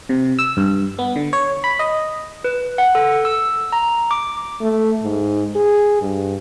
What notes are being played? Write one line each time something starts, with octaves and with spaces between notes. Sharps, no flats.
C3
E6
G2
B3
D3
C#5
B5
D#5
B4
F#5
A4
E6
A#5
D6
A3
G#2
G#4
G2